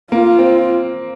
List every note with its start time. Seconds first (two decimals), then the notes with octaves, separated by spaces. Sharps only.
0.12 A#3 F4
0.38 C4